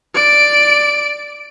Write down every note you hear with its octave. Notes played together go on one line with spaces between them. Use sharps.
D5 D7